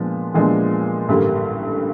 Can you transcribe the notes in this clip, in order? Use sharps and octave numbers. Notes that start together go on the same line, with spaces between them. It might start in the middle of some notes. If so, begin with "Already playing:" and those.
Already playing: A#2 F3 G#3 B3 D4
A#2 F3 G#3 B3 D4
A1 G2 D3 G3 A#3